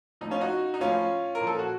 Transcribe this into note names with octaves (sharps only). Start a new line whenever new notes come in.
A2 F3 D#4
C#4 F4
D#4 F#4
D#4
A2 F3 C#4 F4
A#4
A#2 F3
A4
F#4